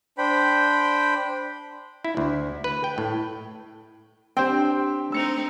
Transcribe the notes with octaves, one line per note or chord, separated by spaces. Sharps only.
D4 C5 G5 B5
E4
D2
B4
G5
A2
C4 D4 G4 C5 G5
A3 C4 D#4 E6 C#7 F7